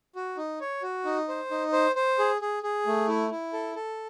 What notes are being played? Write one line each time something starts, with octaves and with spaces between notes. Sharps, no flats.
F#4
D#4
C#5
F#4
D#4
C5
D#4
C5
C5
G#4
G#4
G#4
A3
E4
E4
A4
A4